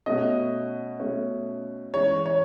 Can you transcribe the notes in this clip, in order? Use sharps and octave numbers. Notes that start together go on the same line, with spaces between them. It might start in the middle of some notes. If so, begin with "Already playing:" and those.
B2 A3 C#4 D#5
B2 A3 C#4
E3 G#3 C#4 C#5
C#5